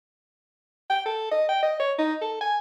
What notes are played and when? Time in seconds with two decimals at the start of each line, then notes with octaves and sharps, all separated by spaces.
0.90 G5
1.06 A4
1.31 D#5
1.49 G5
1.63 D#5
1.79 C#5
1.98 D#4
2.22 A4
2.41 G#5